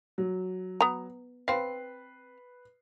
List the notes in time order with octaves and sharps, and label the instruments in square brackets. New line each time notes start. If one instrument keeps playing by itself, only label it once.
[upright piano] F#3
[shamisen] B3 A#5
[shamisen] C4 F5 [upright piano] B4 C7